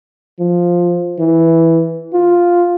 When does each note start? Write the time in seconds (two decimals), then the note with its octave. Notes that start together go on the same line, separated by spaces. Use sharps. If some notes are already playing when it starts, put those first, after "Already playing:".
0.40 F3
1.19 E3
2.14 F4